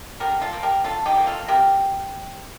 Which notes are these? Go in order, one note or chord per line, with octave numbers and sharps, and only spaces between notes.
D3 G4 A#4
F4 A4
F3 A#3
G4 A#4
D3 F4 A4
D#4 G4
F3 A#3
F4 A4
C3 G4 A#4